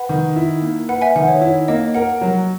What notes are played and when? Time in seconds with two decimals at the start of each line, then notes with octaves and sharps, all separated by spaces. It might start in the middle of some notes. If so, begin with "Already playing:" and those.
Already playing: B4 F#5
0.09 D#3
0.36 E4
0.62 A#3
0.89 B4 F#5
1.01 E5 G#5
1.15 D#3 F#5
1.28 C#5
1.41 E4 C#5
1.68 A#3 D#5
1.95 A#4 F#5
2.21 F#3